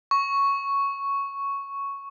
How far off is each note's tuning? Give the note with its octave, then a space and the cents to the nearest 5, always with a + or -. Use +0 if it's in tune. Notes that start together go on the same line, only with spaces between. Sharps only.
C#6 +0